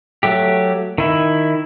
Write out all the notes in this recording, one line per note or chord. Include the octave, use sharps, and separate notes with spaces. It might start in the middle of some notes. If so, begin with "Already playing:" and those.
F#3 A3 G4
D#3 E4